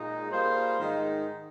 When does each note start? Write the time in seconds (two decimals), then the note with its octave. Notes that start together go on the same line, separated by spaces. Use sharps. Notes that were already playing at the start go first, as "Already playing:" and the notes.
Already playing: A#2 G#3 D#4
0.30 G3 A#3 F4 G#4 C5
0.79 G#2 D#3 G#3 D#4